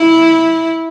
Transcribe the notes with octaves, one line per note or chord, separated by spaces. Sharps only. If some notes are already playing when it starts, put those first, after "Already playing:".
Already playing: E4